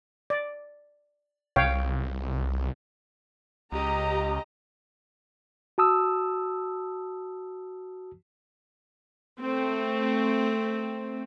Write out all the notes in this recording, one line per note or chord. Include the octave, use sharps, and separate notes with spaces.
D5
C2 C#5 F5 G5
C#2 G4 D#5 A#5
F#4 A5 D#6 E6
A3 C4